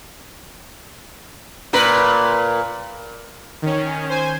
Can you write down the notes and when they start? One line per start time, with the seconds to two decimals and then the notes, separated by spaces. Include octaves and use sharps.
1.73 A#2 A#4 B4
3.62 D#3 C#4
4.09 C5 G#5